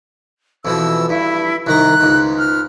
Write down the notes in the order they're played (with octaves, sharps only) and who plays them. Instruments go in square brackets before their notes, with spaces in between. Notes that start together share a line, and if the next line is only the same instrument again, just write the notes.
[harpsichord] F2 B2 E3 [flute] E6
[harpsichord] G2 [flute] E4
[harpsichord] C2 D#3 A#5 [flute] F#6
[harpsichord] C#2 G#2
[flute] F6